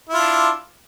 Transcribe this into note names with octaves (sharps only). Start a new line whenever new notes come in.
D4 E4 F4